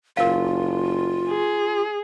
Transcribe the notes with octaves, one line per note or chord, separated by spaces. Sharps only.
F#1 F4 A#4 F5
G#4